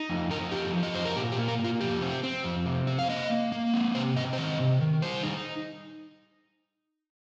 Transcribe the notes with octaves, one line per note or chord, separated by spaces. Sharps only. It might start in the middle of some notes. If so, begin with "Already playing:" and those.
Already playing: D#4
F2
D#4 A#4
F2 G4
F3
D#5
F2 C5
A#4
A#2 G4
G4
A#3
A#4
A#2 F4
F2 G4
C4
C4
F2
C3
C4
F5
A#3 D#5
A#3
A#3
C4
C3 C5
C4 D#5
C5
D#3 D#5
C3
D#3
G3 C5
D#4